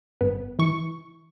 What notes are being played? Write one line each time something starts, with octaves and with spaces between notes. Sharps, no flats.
G1 B3
E3 C#6